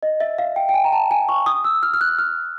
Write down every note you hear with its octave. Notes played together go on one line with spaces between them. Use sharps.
D#5
E5
F5
G5
G5
G#5
A#5
A5
G#5
C#6
D#6
E6
F6
F6
F#6
F6